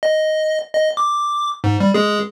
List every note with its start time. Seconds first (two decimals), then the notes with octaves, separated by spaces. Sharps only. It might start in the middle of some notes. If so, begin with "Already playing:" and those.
0.03 D#5
0.74 D#5
0.97 D6
1.64 G#2
1.80 G3
1.94 G#3 G#4